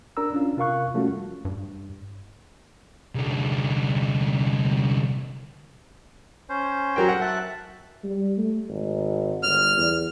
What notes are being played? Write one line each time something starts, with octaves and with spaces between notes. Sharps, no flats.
D4 A#4 A#5 E6
C#4 D4 F4
C3 F4 A#4 F5 C#6 F#6
F3 G3 A3 C#4 F4 F#4
G2
C2 D3
C#4 C5
F#3 A#4 G5
F#5
E5 A5 F#6
G3
A3
G#1
G1 F6
E2